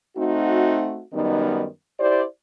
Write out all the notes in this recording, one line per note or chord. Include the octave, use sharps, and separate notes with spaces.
A3 C4 D#4 F#4
F#2 D#3 G3 B3 D#4
E4 G4 C5 D5